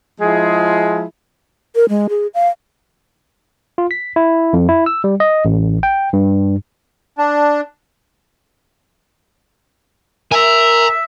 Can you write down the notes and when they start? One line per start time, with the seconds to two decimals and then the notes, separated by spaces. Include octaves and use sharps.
0.21 F3 G#3 E4 G#4
1.75 A#4
1.89 G#3
2.09 G#4
2.34 F5
3.78 F4
3.91 B6
4.16 E4
4.53 F2
4.69 E4
4.86 E6
5.04 G3
5.20 D#5
5.45 A1
5.83 G5
6.13 G2
7.18 D4
10.32 A#4 E5 G#5 A#5